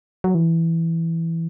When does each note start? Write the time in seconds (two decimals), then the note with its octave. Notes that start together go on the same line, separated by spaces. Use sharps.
0.24 F#3
0.35 E3